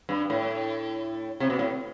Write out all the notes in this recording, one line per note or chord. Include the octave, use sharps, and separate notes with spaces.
G2
A2
C3
B2
A2